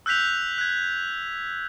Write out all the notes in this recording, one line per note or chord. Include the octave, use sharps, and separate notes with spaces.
E6 F#6 G6 B6 F7
F#6 G#6